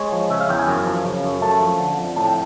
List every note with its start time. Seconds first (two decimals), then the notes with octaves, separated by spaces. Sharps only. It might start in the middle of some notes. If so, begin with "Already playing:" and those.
Already playing: G#3 C#5
0.12 F3
0.30 C#3 E5
0.41 F5
0.49 E2 G5
0.59 G#5
0.67 F#2
0.87 F3
1.05 C#3
1.24 F#2
1.42 A3 A5
1.60 F3
1.80 D3
1.98 F2
2.16 A2 A5
2.27 G5